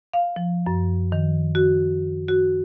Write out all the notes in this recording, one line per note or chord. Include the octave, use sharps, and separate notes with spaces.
F5
F3
F#2
D#3
F#4
F#4